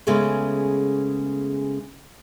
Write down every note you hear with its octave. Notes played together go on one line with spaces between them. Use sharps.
C#3 G#3 A3 B3 C#4